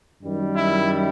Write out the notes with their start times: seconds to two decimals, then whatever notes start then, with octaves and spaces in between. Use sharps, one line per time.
0.22 F#2 D#3 G3
0.55 E4